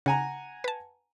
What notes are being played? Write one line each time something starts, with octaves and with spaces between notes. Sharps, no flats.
C#3 F#5 G#5 A#5
B4 A5